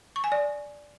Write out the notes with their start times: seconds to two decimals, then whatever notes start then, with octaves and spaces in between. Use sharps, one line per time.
0.16 C#6
0.24 G#5
0.32 D5